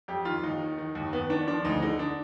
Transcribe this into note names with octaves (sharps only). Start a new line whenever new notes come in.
F2 G4
D#3 F4
D#2 D#4
D#3
D#3
D#2
D#2 B3
D#3 D4
F3 D4
D2 D#4
D3 D#4
D4